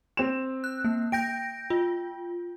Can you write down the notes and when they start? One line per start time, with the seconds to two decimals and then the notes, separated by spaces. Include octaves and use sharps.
0.17 C4 E7
0.64 F#6
0.84 A#3
1.12 G5 G6 A#6 D7
1.70 F4